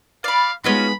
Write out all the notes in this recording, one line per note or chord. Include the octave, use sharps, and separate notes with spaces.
D5 F5 B5
G#3 B3 C#4 D#4 F4 F#4 B5